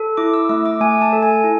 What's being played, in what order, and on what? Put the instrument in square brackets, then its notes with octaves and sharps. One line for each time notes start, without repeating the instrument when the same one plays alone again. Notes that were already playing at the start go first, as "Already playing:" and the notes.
Already playing: [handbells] A4
E4 D6
E6
A3 E6
D6
A3 G#5
A5
A4
G#5
E4